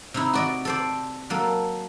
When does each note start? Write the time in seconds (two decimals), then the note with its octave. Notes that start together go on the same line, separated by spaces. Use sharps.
0.14 C3 D#4 E4
0.33 F#4 D5 D#5
0.65 A4 C5 D5
1.30 F#3 A#3 A4